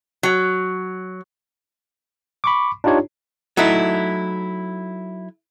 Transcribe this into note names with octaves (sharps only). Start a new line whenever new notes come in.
F#3
B5 C#6 D6
D4 D#4 F4 G4 C#5
F#3 A3 D#4 E4